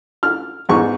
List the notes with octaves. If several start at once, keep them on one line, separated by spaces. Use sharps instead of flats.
F6
E2 G#2 C#6